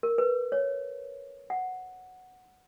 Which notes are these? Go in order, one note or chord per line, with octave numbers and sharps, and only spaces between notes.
A#4
B4
C#5
F#5